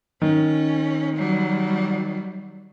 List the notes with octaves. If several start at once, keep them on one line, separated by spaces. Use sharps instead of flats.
D#3 C#4
F#3 G3